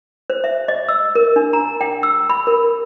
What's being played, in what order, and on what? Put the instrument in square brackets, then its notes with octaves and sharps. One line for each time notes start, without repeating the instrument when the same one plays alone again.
[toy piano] C5
E5
D#5
E6
A#4
D4
A#5
G5
E6
B5
A#4